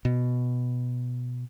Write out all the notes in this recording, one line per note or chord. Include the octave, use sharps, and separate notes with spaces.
B2